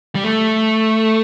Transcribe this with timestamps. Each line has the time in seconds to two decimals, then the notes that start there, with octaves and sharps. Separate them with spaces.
0.15 G3
0.24 A3